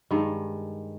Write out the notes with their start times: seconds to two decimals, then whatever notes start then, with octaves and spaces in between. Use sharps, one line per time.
0.11 G2 D#3 G#3